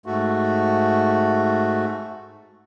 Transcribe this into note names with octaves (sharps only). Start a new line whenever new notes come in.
G#2 A3 F#4